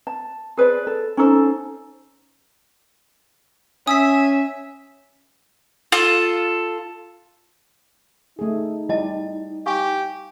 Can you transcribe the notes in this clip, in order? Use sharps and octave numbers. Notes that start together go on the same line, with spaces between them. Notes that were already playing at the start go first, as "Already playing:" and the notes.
A5
G#4 B4 C5 D5
A4
C#4 D#4 A4 C5
C#4 E5 G#5 D#6 E6 B6
F4 A4
A3 D#4 G#4
G3 E4 D#5 A5
G4 F5 G#5 C#6